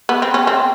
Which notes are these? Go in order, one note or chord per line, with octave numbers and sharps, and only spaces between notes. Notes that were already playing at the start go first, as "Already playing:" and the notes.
B3
C4
C#4
C4